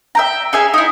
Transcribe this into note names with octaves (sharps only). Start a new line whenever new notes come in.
E5 G5 A#5
C#4 G#4 E5 G#5
D#4 E4